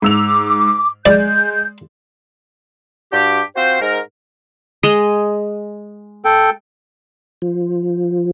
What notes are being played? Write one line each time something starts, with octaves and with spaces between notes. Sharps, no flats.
G#2 D6 E6 F7
G#3 D5 G6
G2 D4 F#4 G4
C4 F4 F#4 C5
G#2 A#4
G#3 D#5
A4 G5
F3